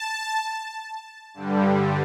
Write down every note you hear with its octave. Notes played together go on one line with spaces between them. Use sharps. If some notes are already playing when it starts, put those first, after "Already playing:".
Already playing: A5
G2 D3 G3